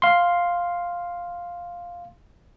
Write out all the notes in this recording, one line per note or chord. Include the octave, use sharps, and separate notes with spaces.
F5 C6